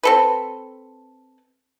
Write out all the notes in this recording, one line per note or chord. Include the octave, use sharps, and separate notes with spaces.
C4 A4 B4